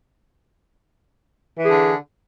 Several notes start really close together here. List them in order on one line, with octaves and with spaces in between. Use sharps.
E3 G#4 D3